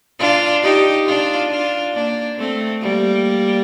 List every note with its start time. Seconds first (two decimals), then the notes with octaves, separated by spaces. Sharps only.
0.19 D4 F4
0.63 D#4 G4
1.07 D4 F4
1.50 D4 F4
1.94 A#3 D4
2.38 A3 C4
2.82 G3 A#3